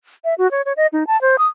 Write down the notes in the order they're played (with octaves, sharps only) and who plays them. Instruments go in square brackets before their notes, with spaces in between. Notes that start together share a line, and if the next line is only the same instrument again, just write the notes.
[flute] E5
F#4
C#5
C#5
D#5
D#4
A5
C5
D#6